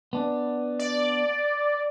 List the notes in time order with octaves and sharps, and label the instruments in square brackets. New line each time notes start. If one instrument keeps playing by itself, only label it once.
[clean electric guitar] B3 D4
[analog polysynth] D5